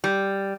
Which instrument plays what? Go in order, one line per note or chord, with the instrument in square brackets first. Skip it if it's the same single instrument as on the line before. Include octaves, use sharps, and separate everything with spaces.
[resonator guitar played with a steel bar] G3